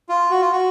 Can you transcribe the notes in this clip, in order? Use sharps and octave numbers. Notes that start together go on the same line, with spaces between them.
F4
F#4
F4
F#4